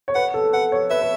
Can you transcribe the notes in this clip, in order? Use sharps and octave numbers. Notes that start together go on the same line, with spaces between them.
C#5
B4 F#5
A4
B4 F#5
C#5
B4 E5
B4